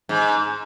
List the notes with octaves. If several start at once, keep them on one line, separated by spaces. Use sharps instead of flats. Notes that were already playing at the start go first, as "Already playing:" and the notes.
G#2